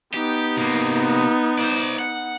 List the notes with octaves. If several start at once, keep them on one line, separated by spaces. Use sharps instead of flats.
B3 D#4 G4
C3 A#3
C5 D5
F#5